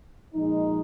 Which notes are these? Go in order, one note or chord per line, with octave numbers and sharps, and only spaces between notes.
A#2 F3 G#3 D#4